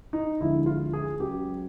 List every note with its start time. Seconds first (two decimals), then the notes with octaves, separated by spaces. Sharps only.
0.13 D#4
0.40 D2 D3 F3 G#3 E4
0.66 F4
0.93 G#4
1.20 C#2 C#3 F#3 G4